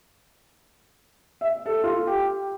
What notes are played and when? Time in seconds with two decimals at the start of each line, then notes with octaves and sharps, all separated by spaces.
1.41 E5
1.66 A4
1.84 F4
2.07 G4